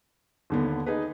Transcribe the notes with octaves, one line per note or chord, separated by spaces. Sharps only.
D#2 D3 B3
D#4 G#4 B4